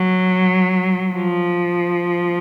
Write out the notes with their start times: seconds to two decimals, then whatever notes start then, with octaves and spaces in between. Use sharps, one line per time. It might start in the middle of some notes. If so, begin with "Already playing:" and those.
Already playing: F#3
1.14 F3